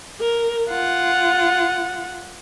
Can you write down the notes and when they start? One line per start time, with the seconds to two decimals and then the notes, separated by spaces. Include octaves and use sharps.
0.20 A#4
0.68 F4 F#5